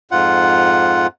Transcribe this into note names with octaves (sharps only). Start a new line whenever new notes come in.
F2 G#2 F4 F#5